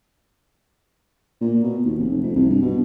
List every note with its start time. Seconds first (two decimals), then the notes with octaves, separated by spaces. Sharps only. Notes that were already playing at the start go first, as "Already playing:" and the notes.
1.41 A#2
1.63 B2
1.85 D#2
1.98 F1
2.23 F2
2.36 C2
2.50 G2
2.62 B2